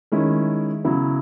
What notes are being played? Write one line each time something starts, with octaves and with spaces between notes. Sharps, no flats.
D#3 G#3 C#4 E4
C#3 F#3 B3 E4